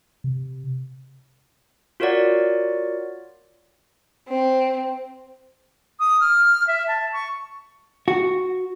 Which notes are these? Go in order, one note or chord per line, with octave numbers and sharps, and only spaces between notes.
C3
F4 F#4 A#4 C#5 D5 F#5
C4
D#6
F6
E5
A5
C#6
F#4